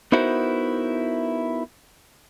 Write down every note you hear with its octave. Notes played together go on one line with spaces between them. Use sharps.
B3 D#4 E4 F#4 A#4 C5